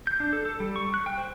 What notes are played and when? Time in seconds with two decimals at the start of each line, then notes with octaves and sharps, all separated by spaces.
0.07 G6
0.20 D4
0.33 A4
0.45 A4
0.60 G3
0.76 C#6
0.94 F#6
1.06 G5
1.18 C5